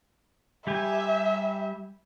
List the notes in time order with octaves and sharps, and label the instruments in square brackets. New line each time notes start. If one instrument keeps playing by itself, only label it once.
[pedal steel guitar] G3 G4 G#5 [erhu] E5